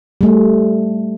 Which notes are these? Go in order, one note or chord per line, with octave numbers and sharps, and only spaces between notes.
G3 A3